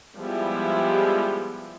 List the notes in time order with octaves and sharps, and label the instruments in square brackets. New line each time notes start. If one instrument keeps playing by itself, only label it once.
[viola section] F3 G3 G#3 B3 E4 G4